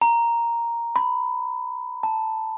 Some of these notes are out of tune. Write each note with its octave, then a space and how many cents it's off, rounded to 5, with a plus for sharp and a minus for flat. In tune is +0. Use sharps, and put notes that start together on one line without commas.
A#5 +0
B5 +15
A5 +5